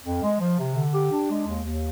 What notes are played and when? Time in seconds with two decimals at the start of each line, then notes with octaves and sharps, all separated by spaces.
0.04 F2
0.22 G#3
0.40 F3
0.58 C3
0.76 D3
0.94 G4
1.11 D4
1.30 G#3
1.47 D#2
1.65 D#2